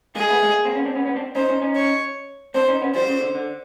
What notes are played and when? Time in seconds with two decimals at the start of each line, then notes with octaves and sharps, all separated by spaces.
0.16 G#3 A#3 G#4
0.29 A3 B3
0.42 G#3 A#3
0.65 A#3 C4
0.75 B3 C#4
0.85 C4 D4
0.95 B3 C#4
1.06 B3 C#4
1.16 C4 D4
1.35 C#4 D#4 C5
1.49 C#4 D#4
1.62 C#4 D#4
1.76 C#5
2.55 C4 D4 C5
2.68 C#4 D#4
2.81 B3 C#4
2.95 F3 G3 C5
3.08 C#3
3.21 D3
3.35 D3